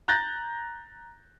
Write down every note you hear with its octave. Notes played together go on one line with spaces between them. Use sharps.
A#5 F#6 G6 A6 A#6